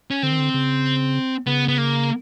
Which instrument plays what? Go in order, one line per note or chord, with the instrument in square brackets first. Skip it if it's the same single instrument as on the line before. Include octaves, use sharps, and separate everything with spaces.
[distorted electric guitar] C#4
[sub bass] D3 [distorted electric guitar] C4
[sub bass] D#3
D3
C#3
[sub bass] C#3 [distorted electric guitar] B3
[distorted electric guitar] B3
A#3